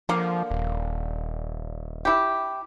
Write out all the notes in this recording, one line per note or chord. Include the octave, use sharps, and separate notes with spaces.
D3 F3 A#3
D#1
E4 G4